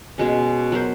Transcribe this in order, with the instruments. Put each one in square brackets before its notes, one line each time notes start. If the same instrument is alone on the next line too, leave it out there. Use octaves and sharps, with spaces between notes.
[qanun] B2 G#3 C#4
F#3 B3 A#4 C5